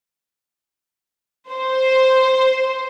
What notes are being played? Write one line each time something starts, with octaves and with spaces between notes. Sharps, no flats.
C5